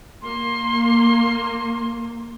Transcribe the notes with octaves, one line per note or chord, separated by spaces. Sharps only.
A#3 C6